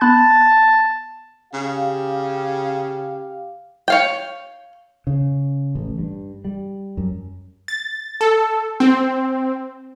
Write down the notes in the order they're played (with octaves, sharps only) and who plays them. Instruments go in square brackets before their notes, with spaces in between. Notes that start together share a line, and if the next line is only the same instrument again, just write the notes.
[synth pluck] B3 B5 F#6 [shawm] A5
[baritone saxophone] C#3 [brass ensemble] G4 F5
[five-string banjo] C#5 F5 G5
[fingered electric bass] C#3
A1
G2
G3
F#2
[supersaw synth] A6
A4
C4